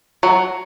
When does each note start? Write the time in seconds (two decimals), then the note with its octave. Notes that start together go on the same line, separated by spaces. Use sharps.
0.23 F#3